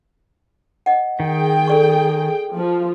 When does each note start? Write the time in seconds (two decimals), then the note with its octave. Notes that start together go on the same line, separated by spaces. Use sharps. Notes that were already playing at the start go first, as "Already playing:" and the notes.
0.86 D#5 F#5
1.20 D#3 G#4 G5
1.68 A4 D5 C#6
2.56 F3